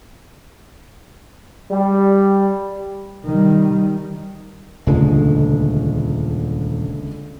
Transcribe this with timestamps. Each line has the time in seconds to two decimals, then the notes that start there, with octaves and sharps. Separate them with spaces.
1.71 G3
3.26 D#3 G3
4.87 D#1 C#2 D3 G#3 A3